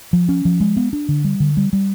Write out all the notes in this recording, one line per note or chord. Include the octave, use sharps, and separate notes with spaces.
F3
C#4
F3
G#3
B3
D4
D3
G3
D3
G3
G3